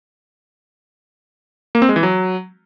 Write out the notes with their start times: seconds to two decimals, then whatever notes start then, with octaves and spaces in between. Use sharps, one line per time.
1.75 A#3
1.82 C4
1.89 G#3
1.96 E3
2.03 F#3